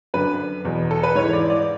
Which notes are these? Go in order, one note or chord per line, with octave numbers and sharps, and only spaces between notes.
F#2 D3 B4
E2 B2
A4
B4
G#2 E3 C#5
D5
D5